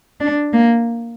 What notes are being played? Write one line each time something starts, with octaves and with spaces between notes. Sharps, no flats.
D4
A#3